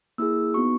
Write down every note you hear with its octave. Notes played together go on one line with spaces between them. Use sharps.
A#3 E4 G#4 E6
B3 D#4 F#4 C#6